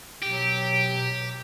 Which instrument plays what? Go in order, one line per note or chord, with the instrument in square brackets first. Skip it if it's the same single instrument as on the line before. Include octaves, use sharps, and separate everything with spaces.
[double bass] B2 [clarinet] F#3 [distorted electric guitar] G4